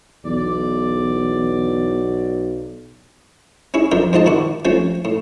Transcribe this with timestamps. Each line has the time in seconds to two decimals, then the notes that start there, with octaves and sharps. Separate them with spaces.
0.25 B1 E2 D5
3.74 C#4 E4 G#4
3.91 F2 F3 D4 A#4 E5 G5
4.13 G#2 C4 F4 D#5 A5
4.26 D#3 E4 F#4 D5
4.65 F3 A3 C4 C#4 F4
5.05 A2